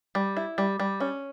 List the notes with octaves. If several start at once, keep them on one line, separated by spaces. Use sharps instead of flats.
G3
E4
G3
G3
C#4